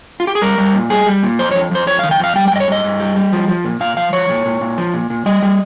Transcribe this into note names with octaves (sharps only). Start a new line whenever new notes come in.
F4
G4
G#4
G3 A#4
G3
A#2
G3 G#4
G3
A#2
F2 C5
C#5
F2
F2 C5
F2 C#5
F5
D#3
G5
F2 F5
G3 G5
G5
G2 D#5
C#5
G2 D#5
G2
G3
G3
F3
F3
A#2
A#2 F5
F3 F5
F3 C#5
A#2
A#2
A#2
F3
A#2
A#2
G3 D#5
G3